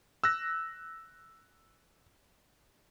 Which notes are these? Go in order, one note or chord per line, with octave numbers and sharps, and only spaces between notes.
E6 F#6 A#6